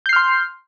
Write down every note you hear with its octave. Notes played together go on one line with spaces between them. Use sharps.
C6 F6 G6 C7